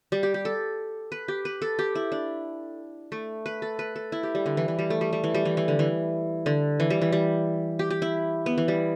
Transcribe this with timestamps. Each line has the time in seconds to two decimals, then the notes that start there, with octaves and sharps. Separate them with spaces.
0.12 G3
0.23 G4
0.34 G4
0.45 A4
1.12 B4
1.28 G4
1.45 B4
1.62 A4
1.79 G4
1.95 E4
2.12 D4
3.12 A3
3.46 B4
3.62 A4
3.79 B4
3.96 A4
4.12 E4
4.23 G4
4.35 G3
4.46 D3
4.57 E3
4.68 E3
4.79 G3
4.90 A3
5.01 G3
5.13 G3
5.24 E3
5.34 G3
5.45 E3
5.57 E3
5.68 D3
5.79 E3
6.46 D3
6.80 E3
6.90 G3
7.01 E3
7.12 G3
7.79 G4
7.90 G4
8.02 E4
8.46 B3
8.58 E3
8.68 G3